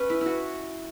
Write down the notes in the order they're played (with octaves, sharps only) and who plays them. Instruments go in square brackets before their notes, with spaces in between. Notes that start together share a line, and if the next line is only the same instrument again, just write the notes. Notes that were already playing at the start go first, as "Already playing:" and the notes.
Already playing: [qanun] C#4 [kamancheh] B4
[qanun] E4
E4 F#4